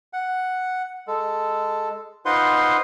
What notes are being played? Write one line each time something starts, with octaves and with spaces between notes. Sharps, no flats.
F#5
G#3 A4
D#4 F4 B4 C5 F#5 C6